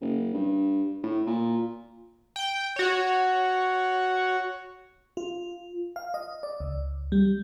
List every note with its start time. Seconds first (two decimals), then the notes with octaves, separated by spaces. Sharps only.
0.01 F#1
0.34 G2
1.03 A2
1.27 A#2
2.36 G5
2.76 F#4 C#5
5.17 F4
5.96 F5
6.14 D#5
6.43 D5
6.60 C#2
7.12 G3